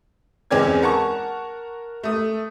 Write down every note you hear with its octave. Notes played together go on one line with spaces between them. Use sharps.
E2 G#3 C4 C#4 D5 G#6
A#4 F#5 A5 C#6
A3 D#6